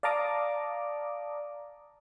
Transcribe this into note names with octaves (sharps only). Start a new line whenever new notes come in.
D5 F5 A5 A#5 D6 D#6